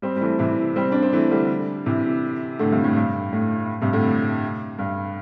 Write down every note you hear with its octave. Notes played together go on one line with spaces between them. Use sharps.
G3 C4
G3
E3 A3
C3 E3
G3 C4
D4
C4
E3 A3
D3 G3
C3 E3
A2 D3
G2 C3
A2
G2
A2
G2 C3
A2 D3
G2